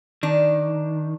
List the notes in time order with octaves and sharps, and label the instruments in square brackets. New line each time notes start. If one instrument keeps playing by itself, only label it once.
[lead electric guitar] D#3 [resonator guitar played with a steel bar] D4